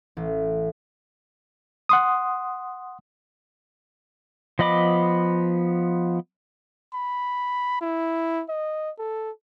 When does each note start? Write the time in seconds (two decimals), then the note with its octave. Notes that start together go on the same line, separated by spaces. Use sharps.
0.17 A1
1.89 F#5 C6 D#6
4.59 F3 B3 D#5 B5 D6
6.93 B5
7.81 E4
8.49 D#5
8.98 A4